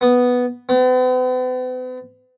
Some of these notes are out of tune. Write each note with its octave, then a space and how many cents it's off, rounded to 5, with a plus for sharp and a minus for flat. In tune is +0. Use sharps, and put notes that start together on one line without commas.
B3 +0
B3 +45